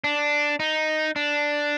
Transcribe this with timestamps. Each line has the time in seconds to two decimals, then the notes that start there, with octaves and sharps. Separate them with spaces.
0.04 D4
0.60 D#4
1.16 D4